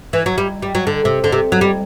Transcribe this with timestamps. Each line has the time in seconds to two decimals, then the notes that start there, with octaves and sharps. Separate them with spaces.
0.13 E3
0.26 F#3
0.38 G3
0.62 G3
0.75 F#3
0.87 D3
1.05 C3
1.24 D3
1.32 C3
1.52 F#3
1.61 G3